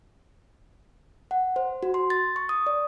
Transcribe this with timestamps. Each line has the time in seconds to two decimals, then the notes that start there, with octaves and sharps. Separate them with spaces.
1.31 F#5
1.56 C5
1.83 F#4
1.94 C6
2.10 A6
2.36 C#6
2.49 D#6
2.67 D5